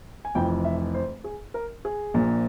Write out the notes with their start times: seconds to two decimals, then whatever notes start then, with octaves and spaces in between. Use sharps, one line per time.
0.25 G#5
0.35 F1 F2 E3 G5
0.65 E5
0.94 C5
1.24 G#4
1.54 A#4
1.85 G#4
2.14 A#1 A#2 F3